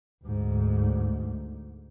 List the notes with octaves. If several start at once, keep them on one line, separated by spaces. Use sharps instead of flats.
D2 G#2